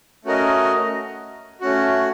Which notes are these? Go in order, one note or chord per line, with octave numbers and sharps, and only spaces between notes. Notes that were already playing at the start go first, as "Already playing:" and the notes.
A3 C#4 F#4 A#4 D#5
A3 C#4 F#4